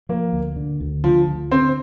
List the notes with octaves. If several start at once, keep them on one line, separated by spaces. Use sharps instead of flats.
F3 A#3
D2
D3
D2
D3 F3
D2
D3 C4